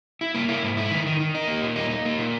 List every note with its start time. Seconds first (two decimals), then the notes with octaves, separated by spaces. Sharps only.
0.21 E4
0.35 A#3
0.49 E4
0.63 G#2
0.77 E4
0.91 D#3
1.06 D#3
1.20 D#3
1.35 D#4
1.48 A#3
1.62 A#2
1.76 D#4
1.90 D#4
2.05 A#3
2.18 A#2